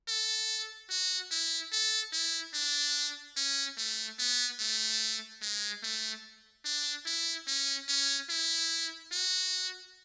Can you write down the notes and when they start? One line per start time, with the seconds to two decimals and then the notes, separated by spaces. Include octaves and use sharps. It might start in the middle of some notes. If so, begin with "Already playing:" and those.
0.08 A4
0.90 F#4
1.31 E4
1.72 A4
2.13 E4
2.54 D4
3.36 C#4
3.78 A3
4.19 B3
4.59 A3
5.42 G#3
5.83 A3
6.65 D4
7.06 E4
7.47 C#4
7.88 C#4
8.30 E4
9.12 F#4